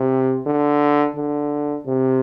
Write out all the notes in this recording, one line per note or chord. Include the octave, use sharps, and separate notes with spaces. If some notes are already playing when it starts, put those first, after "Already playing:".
Already playing: C3
D3
D3
C3